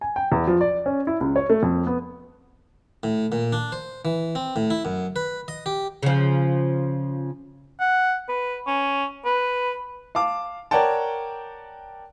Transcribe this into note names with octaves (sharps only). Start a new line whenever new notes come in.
G#5
G5
E2
F3
D5
C#4
E4
C#2
C#5
A3
F2
B3
A2
A#2
D4
C5
E3
C4
A2
E4
F#2
B4
D#5
G4
C#3 F3
F#5
B4
C#4
B4
F5 A5 D6
A#4 C#5 D5 F#5 G5 A5